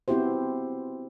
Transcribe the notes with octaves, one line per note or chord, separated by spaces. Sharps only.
B3 C4 E4 F#4 G4 C5